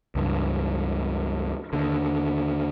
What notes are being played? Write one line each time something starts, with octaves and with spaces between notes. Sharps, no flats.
C#2 G2
D#2 D3